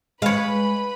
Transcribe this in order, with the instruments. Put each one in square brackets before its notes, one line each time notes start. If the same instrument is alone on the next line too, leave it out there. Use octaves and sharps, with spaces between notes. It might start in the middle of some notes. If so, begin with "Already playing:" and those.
[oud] G#3 [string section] B4 B5 [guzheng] C#5 F5